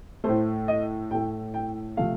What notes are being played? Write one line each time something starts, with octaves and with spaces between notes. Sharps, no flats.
A2 A3 C5
D#5
A2 A3 G5
G5
C3 F3 A3 F5